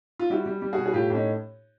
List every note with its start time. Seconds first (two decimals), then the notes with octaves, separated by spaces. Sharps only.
0.19 F4
0.30 G3 E4 F#4
0.46 G3
0.62 G3
0.73 B2 F#4 G#4
0.86 G#4
0.93 A2 F4 G4
1.10 A2 C#4 D#4